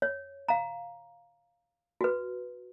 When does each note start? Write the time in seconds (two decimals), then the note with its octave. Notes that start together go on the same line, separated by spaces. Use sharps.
0.02 C#5
0.49 F5 A#5
2.01 F#4 B4